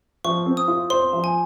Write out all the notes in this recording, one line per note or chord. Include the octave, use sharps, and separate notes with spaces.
F3 C#6
C4
D#6
F4
C5 C6
F3
G#5